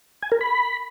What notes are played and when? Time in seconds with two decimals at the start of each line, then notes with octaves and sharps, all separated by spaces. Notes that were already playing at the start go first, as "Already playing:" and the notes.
0.22 G#5
0.32 A#4
0.41 B5